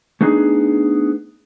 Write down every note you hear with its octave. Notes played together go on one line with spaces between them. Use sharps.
A3 B3 D4 D#4 G#4